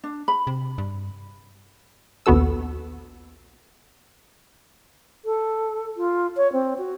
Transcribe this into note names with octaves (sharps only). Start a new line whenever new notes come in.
D4
B5
C3
G2
A#1 D#2 B3 F#4 A4 E6
A4
F4
C#5
C4
F#4